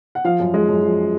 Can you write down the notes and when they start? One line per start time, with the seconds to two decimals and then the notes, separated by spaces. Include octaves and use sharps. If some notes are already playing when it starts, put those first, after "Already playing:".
0.15 F#5
0.24 F3 F5
0.40 F#2
0.54 G#3
0.69 F#2
0.83 F3